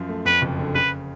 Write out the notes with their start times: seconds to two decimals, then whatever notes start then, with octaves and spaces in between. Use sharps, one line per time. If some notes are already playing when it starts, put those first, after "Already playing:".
Already playing: F#2 F3
0.09 A3
0.25 F2 B4
0.42 F#1
0.59 D3
0.75 C#3 B4